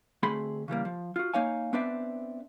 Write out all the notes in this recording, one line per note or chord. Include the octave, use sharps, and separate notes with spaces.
D2 A3 C4 G#4 B5 C6
C#3 E3 G3 A#3
F3
F4 F#4
A#3 D#4 C#5 F5 G#5
B3 C4 D4 B4 D5 E5